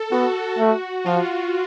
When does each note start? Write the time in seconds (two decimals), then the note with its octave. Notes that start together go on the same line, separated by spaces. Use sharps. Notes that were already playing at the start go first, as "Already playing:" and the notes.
Already playing: A4
0.12 B3 F#4
0.58 A3
1.05 F3 F4